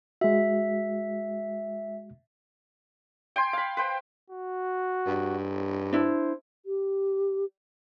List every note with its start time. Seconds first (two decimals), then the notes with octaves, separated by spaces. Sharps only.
0.21 G#3 F#4 E5
3.36 G5 G#5 C6
3.53 F5 B5
3.77 B4 C5 G5
4.30 F#4
5.06 G2
5.93 D4 E4 C5
6.66 G4